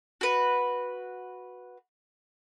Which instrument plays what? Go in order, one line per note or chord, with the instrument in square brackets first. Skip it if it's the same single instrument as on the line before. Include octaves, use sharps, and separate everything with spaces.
[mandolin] F#4 B4